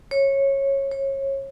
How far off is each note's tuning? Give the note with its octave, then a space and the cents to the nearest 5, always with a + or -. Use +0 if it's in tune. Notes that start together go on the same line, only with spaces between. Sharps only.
C#5 -15
C#5 -25